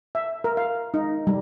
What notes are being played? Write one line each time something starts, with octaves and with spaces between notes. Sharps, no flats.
E5
A#4
F5
D#4
G3